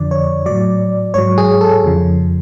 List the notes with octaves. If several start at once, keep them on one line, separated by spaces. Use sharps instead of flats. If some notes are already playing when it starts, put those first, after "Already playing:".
Already playing: F2 D3 F3 D5
C#5
A2 F#3 D5
G#2 F#3 C#5
G#4
A4
F2 C#3 F3